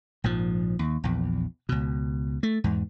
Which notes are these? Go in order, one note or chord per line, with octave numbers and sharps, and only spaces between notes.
A#1 G#2 F3
D#2
A#1 E2
C#2 B2
A3
E2 G#2